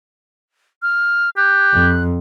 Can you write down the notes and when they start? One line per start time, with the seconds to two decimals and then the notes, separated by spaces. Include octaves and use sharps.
0.82 F6
1.37 G4 F#6
1.73 F2